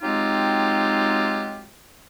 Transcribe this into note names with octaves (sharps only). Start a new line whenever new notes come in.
F#3 G#3 C4 D#4 F4 G4